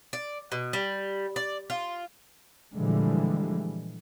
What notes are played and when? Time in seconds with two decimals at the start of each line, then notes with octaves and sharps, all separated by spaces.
0.13 D5
0.52 B2
0.73 G3
1.36 D5
1.70 F4
2.75 A#2 D3 E3 F3 G3 G#3